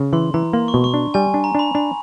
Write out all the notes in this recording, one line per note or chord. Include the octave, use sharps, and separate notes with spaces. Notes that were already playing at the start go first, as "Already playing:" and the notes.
Already playing: C#3
E3 C6
E3 A#5
A#3 C6
C#6
B2
C#6
D4
G3 G#5
D4
A#5
D4 B5
D4 B5